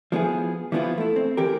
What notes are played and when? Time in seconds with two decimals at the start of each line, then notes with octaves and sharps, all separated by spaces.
0.12 F3 B3 E4 G#4
0.72 E3 F3 B3 E4 F4
0.98 A3 E4
1.16 C4
1.37 E3 G4 A#4